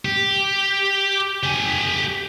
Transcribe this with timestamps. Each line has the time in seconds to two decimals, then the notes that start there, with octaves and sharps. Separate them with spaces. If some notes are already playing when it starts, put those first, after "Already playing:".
0.05 G4
1.43 G4 G#5